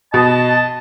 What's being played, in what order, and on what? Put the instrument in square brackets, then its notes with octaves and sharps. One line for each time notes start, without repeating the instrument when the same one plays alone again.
[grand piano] B2 [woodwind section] D#5 A5